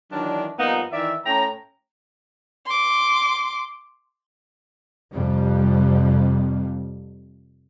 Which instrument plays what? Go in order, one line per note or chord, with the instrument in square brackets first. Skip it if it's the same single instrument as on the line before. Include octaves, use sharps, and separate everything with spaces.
[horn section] D#3 E3 F#3 D4
G2 F3 A#3 B3 D#4
D#3 E3 D5 E5
A2 C#4 G5 A#5
[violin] C6 D6
[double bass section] F2 C3 G3